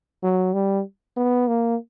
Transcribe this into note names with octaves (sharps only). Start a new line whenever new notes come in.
F#3
G3
B3
A#3